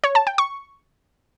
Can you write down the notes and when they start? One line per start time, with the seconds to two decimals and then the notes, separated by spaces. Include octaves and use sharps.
0.04 C#5
0.15 A5
0.27 G5
0.38 C#6